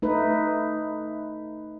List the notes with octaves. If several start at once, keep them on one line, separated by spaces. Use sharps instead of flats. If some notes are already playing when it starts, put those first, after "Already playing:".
A3 D#4 B4